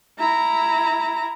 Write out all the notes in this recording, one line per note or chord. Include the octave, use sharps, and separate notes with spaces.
E4 A#5